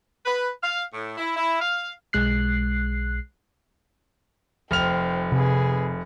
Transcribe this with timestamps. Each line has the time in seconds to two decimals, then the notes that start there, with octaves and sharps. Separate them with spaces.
0.25 B4
0.63 F5
0.93 A2
1.18 E4
1.37 E4
1.60 F5
2.13 B1 G#3 F#6 C7
4.71 F1 C5 G5 F6 F7
5.32 C3 G#4 B4